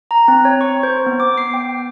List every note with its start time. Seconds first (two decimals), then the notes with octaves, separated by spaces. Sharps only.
0.11 A#5
0.28 C4
0.45 C#5
0.61 C#6
0.83 C5
1.06 B3
1.20 D6
1.38 C7
1.54 G5